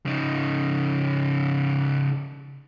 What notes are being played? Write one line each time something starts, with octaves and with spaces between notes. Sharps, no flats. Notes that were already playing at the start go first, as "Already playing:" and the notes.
C#3 D#4